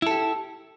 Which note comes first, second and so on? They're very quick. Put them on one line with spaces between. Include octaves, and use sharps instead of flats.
E4 A4 G4